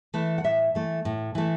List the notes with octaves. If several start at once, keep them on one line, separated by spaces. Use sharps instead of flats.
E3 A3
F#5
A2 E5
E3 A3
A2
E3 A3